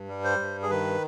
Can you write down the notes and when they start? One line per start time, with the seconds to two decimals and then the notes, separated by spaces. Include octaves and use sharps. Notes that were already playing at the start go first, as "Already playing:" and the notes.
Already playing: G2
0.09 G3
0.24 C5
0.40 G2
0.63 G#4
0.70 D#3 B4